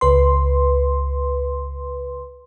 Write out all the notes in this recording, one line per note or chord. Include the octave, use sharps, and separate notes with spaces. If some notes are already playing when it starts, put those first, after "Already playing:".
C#2 B4 C6